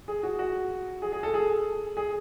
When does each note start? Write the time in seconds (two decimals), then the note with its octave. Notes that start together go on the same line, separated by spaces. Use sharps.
0.08 G#4
0.23 F#4
0.39 F#4
1.02 G#4
1.12 G#4
1.23 A4
1.34 G#4
1.97 G#4